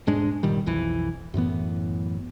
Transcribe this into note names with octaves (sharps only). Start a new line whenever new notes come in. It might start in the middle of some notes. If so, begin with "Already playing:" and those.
E1 G#2 G#3 D4
G1 A#2 D#3 G3
B1 F2 E3
F#2 A2 E3 B3